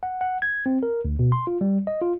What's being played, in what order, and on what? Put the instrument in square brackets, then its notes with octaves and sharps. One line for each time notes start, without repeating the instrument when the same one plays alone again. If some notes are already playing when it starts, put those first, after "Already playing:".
[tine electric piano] F#5
F#5
G#6
C4
A#4
D2
B2
C6
F4
G3
D#5
F4